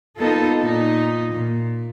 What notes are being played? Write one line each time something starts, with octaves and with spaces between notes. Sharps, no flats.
A#3 B3 D#4 F4 A4
A#2 D#4
A#2